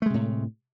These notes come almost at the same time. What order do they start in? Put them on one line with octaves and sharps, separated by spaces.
A3 G#3 C3 A2